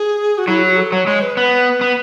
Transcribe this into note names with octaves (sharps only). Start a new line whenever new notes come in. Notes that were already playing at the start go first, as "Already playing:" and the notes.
Already playing: G#4
F#4
F#3 E4
F#4
A4
F#3 C#5
G#3 C#5
B4
B3 B4
B3